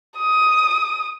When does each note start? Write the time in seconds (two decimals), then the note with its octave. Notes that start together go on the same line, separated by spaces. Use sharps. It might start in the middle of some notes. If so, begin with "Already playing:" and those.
0.18 D#6